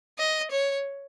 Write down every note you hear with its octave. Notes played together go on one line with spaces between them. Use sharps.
D#5
C#5